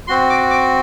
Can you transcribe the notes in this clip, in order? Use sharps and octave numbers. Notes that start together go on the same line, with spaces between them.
C4 F#4 C6
D6
D6